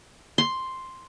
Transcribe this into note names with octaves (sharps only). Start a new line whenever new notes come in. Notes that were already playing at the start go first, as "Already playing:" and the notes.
C6